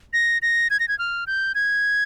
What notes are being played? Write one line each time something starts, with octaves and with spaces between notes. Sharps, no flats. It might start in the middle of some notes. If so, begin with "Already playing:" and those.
A#6
A#6
G#6
A#6
G#6
F6
G6
G#6